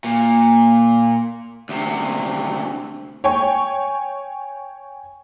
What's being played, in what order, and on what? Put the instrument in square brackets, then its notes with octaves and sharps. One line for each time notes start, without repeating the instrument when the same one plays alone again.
[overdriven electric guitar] A#2
D2 C3
[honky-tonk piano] C#5 G5 G#5 C#6